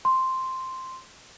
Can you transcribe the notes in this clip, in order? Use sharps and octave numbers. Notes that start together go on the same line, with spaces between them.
C6